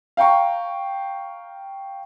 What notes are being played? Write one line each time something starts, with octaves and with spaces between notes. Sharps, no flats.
F5 G5 A#5 C#6